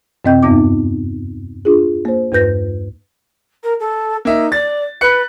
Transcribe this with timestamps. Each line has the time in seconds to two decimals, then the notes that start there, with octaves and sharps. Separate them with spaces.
0.25 F#2 C3 C4 D#5 G5 G6
0.43 E2 G2 B3 D#4 D6
1.65 D4 F4 G#4
2.05 A#3 C5
2.32 E2 G2 B4 G6 A#6
3.63 A#4
3.79 A4
4.25 A#3 D#4 E5
4.52 D5 A6
5.01 B4 F#6 C#7